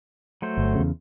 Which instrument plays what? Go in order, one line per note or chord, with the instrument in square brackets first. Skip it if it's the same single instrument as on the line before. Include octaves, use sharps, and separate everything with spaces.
[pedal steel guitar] F#3 A3 C5
[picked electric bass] G1
E2 C#3